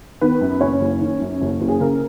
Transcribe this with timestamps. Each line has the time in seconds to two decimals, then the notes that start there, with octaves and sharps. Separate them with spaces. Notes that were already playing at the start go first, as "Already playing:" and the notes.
0.21 D#3 B3 B4
0.41 F#2
0.61 F#1 C#4 C#5
0.81 F#1
1.01 D#3
1.21 F#2
1.41 F#1
1.61 F#1
1.68 G#4
1.80 C#3 A#4